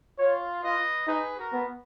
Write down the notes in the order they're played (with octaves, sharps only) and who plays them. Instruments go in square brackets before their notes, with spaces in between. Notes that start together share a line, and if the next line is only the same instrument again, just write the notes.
[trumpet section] F4 [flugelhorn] C#5
[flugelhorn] F4 [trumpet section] B4 D#5
[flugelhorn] D#4 [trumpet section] G#4 B4
[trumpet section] F#4 A#4
[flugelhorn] B3